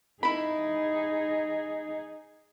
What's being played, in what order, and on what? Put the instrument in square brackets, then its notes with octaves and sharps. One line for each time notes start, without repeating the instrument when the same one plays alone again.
[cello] D#4 G#4 [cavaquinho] E4 B5